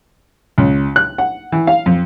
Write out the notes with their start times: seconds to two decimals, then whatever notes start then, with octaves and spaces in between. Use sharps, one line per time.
0.58 C#2
0.96 F#6
1.18 F#5
1.52 E3
1.67 F5
1.86 F2